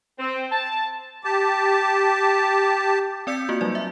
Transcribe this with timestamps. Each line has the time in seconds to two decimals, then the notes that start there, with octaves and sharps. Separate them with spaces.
0.19 C4
0.51 A5
1.24 G4 A5
3.27 C4 D5 E6 G6 B6 C#7
3.49 A#3 F4 F#4
3.61 F#3 G3 D#4 D5
3.75 E5